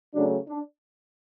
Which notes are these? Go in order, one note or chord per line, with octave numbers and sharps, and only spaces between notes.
C#3 F#3 A3 D4
D4